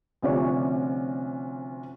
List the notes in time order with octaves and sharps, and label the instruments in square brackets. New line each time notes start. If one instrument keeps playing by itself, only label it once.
[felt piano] D2 C3 F3 C#4 C#5 D5